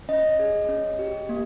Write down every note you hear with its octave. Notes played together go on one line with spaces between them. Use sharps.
C#4 D#5
G#4
C#4
G4
A#3